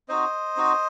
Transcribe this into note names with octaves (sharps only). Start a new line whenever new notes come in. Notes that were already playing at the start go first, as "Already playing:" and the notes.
C4 D#4 F#4 C5 D#5
C4 D#4 F#4